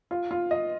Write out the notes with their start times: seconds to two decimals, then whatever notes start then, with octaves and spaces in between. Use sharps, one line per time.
0.11 F4
0.31 F4
0.51 D#5